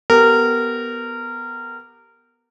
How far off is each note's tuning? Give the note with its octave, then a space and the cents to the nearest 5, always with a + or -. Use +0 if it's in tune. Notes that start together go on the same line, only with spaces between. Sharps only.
B3 +0 G4 +0 A#4 -20